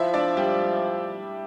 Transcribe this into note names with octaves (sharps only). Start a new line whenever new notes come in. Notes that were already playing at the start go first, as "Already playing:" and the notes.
Already playing: F3 E4 E5
D4 D5
G3 G4